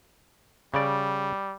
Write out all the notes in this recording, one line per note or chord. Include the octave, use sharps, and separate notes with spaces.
C#3 G3 D5